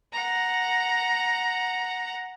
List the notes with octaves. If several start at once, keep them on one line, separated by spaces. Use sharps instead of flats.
F#5 A#5